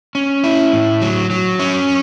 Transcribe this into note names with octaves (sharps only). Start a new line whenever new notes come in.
C#4
E4
A2
F#3
F#3
C#4